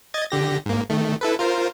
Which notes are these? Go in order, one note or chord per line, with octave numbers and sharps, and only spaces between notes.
D#5 G#6 A6
D3 G4 A#6
G#2 A#3
D#3 A3
E4 A4 B4
F4 A#4 C5